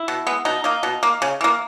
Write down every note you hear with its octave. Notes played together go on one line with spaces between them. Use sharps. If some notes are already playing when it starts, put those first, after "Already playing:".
Already playing: E4
B2
G#3 B3
B2 D#4
A#3 D#4
B2
A#3
C#3
E3 A#3